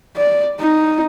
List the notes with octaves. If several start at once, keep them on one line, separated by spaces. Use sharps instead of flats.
D5
D#4